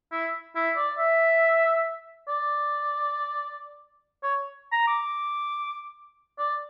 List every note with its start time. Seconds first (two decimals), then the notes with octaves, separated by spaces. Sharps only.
0.12 E4
0.55 E4
0.77 D5
0.98 E5
2.28 D5
4.23 C#5
4.72 A#5
4.87 D6
6.39 D5